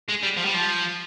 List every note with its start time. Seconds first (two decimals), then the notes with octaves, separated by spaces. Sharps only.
0.09 G#3
0.23 G3
0.37 F3
0.46 G3
0.54 F3